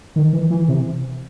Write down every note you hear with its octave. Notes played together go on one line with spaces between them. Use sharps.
D#3
E3
E3
C3